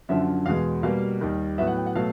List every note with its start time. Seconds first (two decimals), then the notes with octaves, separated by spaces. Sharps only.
0.09 F#2 D3 F3 E5
0.46 E2 B2 G#3 F5
0.83 B2 G3 A#3 F5
1.21 D#2 D#3 G3
1.58 A2 F#3 B3 E5
1.67 F#5
1.77 G5
1.86 F#5
1.95 B2 F#3 A3 F5